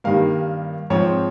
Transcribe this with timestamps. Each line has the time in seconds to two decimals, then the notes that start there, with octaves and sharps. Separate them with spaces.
0.04 G2 D#3 G3 A#3 F5
0.90 G#2 F3 C4 C#5